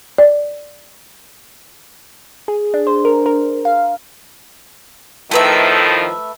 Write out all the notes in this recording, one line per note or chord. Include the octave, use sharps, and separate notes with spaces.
D5
G#4
D4
C5
A#4
A#4
F5
A2 D#3 F3 A3 B4 E5